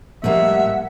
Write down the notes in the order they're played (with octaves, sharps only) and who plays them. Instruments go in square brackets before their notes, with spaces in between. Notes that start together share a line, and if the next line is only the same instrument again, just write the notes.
[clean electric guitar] A2 G3 [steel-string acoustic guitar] F3 G#3 A#3 [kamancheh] E5 [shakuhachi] F#5